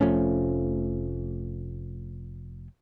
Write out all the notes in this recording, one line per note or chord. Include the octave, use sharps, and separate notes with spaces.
F1 F3 A3 C#4